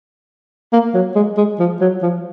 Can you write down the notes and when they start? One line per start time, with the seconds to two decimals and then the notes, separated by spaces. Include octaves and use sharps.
0.73 A#3
0.94 F#3
1.16 G#3
1.37 G#3
1.60 F3
1.81 F#3
2.03 F3